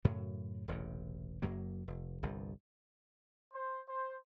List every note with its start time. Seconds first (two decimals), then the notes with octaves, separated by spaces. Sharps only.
0.05 F#2 A2 C#3 F#3
0.68 E1 A1 E2 C3
1.42 F#1 F#2 F#3 A#3
1.88 F1
2.23 G1 C2 G2
3.52 C5
3.87 C5